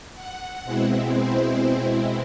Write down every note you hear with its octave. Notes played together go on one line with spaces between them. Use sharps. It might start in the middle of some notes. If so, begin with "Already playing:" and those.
F#5
B2 G#3 C4 E4
C5